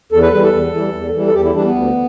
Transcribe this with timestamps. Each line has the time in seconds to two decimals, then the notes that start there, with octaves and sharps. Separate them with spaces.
0.12 E2 A4
0.22 B4
0.33 E3 G3 B4
0.43 A4
0.53 E2
0.73 E3 G3
0.94 E2
1.15 E3 G3
1.27 A4
1.34 E2 G4
1.44 E4
1.54 E3 G3 D4
1.64 B3
1.75 D2